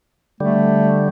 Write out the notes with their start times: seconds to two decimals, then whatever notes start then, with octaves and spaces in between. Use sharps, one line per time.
0.40 D3 G3 A3